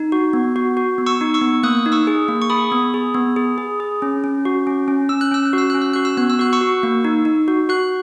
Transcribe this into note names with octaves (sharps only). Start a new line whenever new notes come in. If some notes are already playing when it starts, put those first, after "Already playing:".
Already playing: D#4
F#4
B3
F#4
F#4
B3
C#6 E6
D#4
C#6 E6
B3
A#3 D#6 F#6
D#4
C#6 E6
G#4
A#3
C#6
G#4 B5 D#6
B3
G#4
B3
G#4
G#4
G#4
C#4
C#4
F#4
C#4
C#4
C#4 E6
F#6
C#4 E6
F#6
F#4
E6
C#4 F#6
E6
F#4 F#6
E6
B3 F#6
E6
F#4 F#6
C#6 E6
F#4
A#3
D#4
D#4
F#4
F#4 F#6